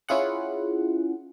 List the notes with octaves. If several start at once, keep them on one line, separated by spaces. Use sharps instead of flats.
C#4 E4 F4 G#4 F#5